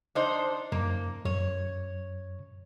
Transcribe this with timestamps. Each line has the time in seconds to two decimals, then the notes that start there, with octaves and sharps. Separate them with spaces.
0.15 D4 D#4 C5
0.72 F#2 A#3
1.25 F#2 C#5